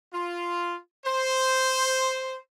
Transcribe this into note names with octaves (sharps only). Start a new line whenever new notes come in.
F4
C5